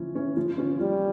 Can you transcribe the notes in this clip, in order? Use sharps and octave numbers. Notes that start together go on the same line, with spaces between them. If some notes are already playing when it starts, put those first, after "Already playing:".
Already playing: F3 C#4 E4
C#4 E4
F3
C#4 F4
F3 G3